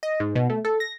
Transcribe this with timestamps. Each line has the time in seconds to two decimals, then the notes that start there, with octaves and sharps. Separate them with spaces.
0.03 D#5
0.20 G#2
0.35 B2
0.50 A3
0.65 A4
0.80 A#6